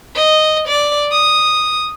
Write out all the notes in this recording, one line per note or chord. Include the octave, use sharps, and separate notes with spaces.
D#5
D5
D#6